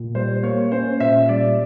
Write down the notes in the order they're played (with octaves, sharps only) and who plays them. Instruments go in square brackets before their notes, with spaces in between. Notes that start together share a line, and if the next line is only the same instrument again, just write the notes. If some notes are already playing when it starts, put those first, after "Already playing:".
Already playing: [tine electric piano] A#2
[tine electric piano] G3 [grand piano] C5
[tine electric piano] A#3 [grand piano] C#5
[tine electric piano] C#4 [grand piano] C5
[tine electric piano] A#2 [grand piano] E5
[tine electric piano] G3 [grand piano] D5